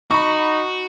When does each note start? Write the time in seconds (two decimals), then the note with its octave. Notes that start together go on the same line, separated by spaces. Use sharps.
0.11 D#4 F#4 B5 C#6